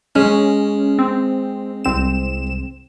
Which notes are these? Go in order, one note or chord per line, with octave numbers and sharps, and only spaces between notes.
G#3 C#4
C4
C2 C4 E7